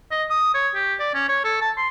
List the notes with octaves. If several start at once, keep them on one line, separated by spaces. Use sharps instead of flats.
D#5
D#6
C#5
G4
D5
C#4
C#5
A4
A5
C6